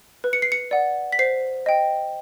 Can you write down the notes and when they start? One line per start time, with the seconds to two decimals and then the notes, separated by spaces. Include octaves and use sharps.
0.24 B4
0.33 C#7
0.42 C7
0.52 C#7
0.71 D5 F#5
1.12 B6
1.19 C5 C7
1.66 D#5 G5